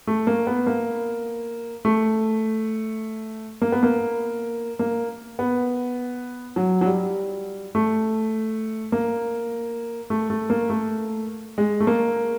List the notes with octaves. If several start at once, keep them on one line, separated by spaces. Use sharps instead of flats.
A3
A#3
B3
A#3
A3
A#3
B3
A#3
A#3
B3
F#3
F#3
G3
A3
A#3
A3
A3
A#3
A3
G#3
A3
A#3